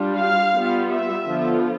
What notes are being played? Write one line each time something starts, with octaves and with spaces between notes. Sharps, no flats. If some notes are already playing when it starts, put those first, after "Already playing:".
Already playing: G3 D4 F4
F5
G3 B3 F4
E5
D3 F3 B3 F4